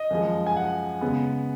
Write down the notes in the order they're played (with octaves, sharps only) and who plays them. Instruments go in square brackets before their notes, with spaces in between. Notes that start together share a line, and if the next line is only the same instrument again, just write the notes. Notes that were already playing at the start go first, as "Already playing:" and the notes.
Already playing: [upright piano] D#5
F#2 F3 G#3
G#5
F#5
C#3 G#3 B3